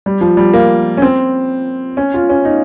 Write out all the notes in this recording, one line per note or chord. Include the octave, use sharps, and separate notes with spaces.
G3
F3
G3
A#3
C#4
C4
C#4
F4
C#4
D#4